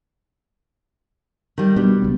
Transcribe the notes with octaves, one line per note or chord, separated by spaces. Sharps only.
D#3 G3
B2 G3 D4
C#2 B3